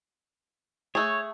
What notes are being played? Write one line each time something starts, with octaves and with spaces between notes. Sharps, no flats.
A3 G#4 C#5